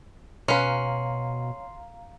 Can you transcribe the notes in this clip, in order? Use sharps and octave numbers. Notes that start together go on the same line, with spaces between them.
B2 C#4 B4 F5 A#5 C6 C7